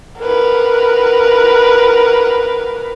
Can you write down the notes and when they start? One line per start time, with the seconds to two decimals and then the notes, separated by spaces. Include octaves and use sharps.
0.21 A#4 B4